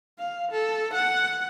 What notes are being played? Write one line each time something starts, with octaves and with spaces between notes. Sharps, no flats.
F5
A4
F#5